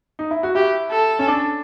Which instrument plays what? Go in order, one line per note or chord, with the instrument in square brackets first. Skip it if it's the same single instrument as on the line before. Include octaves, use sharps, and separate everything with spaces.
[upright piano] D#4
E4
F#4
[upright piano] E4 [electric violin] G4
[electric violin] A4
[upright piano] C#4
D4